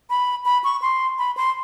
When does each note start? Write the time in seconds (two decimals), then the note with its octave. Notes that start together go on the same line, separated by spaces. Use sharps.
0.10 B5
0.45 B5
0.64 C#6
0.82 C6
1.19 B5
1.37 C6